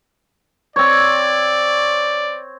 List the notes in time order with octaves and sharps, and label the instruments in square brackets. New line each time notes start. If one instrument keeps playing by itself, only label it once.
[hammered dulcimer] C4 C#5 [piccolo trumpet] D5